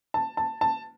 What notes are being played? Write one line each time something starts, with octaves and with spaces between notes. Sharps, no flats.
A5
A5
A5